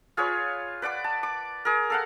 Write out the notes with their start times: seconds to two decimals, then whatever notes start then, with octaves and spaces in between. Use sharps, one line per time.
0.17 F4 G#4 B4 C#5
0.82 B4 D5 F#5 D6
1.04 A5
1.23 D6
1.65 G#4 A#4
1.90 A4 F5 F#5